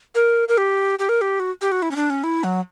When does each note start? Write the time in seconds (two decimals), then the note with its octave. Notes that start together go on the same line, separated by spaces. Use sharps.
0.15 A#4
0.49 A#4
0.58 G4
0.99 G4
1.09 A#4
1.21 G4
1.40 F#4
1.62 G4
1.72 F#4
1.82 E4
1.91 C#4
1.96 D4
2.10 C#4
2.24 E4
2.44 F#3